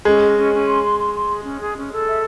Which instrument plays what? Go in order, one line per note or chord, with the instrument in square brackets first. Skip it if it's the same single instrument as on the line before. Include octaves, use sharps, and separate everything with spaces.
[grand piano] G#3 [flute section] C#4
[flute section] D#5
C#4
C#4
C6
C6
C6
C6
G#4
C#4
G#4
C#4
A4
E5